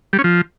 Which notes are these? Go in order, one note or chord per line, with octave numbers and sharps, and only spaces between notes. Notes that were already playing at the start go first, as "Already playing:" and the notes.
G3
C#4
F3